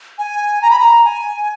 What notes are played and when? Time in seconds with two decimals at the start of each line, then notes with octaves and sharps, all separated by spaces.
0.18 G#5
0.62 A#5
0.70 B5
0.79 A#5
1.04 G#5